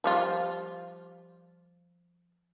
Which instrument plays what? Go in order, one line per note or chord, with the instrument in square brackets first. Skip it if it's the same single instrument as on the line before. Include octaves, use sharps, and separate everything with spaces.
[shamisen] F3 G3 F4